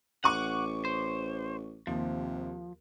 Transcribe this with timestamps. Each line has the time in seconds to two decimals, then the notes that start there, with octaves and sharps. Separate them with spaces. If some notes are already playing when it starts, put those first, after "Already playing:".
0.24 A1 F#5 C#6 D6 D#7
0.85 C5
1.87 D#2 C3 F3